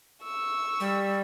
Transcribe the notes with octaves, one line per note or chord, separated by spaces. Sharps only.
C#6 E6
G3